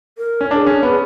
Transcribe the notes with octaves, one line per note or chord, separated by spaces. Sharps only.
A#4
C#4
D4 G#4 A#4
C#4
B3